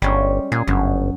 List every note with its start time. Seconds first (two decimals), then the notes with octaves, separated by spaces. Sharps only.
0.02 G1 G3 G#3 C#4
0.52 A#2 G#4
0.67 G1 F#2